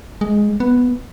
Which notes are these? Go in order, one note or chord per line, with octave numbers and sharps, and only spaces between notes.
G#3
B3